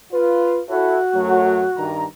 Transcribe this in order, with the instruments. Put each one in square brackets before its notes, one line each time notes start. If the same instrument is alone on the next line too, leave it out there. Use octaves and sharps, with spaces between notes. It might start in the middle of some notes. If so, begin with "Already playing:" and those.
[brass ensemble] F4 B4
[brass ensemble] E4 A4 C#5 [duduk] F#4
[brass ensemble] F#2 F#3 A3
G2 D#3 A#5